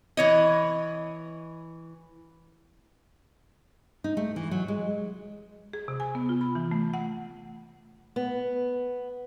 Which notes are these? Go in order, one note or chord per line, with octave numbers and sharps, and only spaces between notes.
E3 C#5 D#5
D#4
A3
E3
F#3
G#3
G#4
C3
G#5
B3
F4
B5
E3
A3
F#5
B3